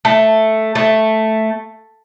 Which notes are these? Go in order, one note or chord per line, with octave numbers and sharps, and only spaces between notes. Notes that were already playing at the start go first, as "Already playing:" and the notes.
A3
A3